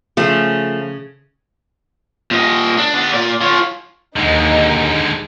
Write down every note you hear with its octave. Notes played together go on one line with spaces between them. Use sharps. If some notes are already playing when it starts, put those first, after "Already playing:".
C#3 F3 A3
A#2 D#5
D4
B3 D5
A#2 D5
F4 C#5
D#2 D3 G#3 D#4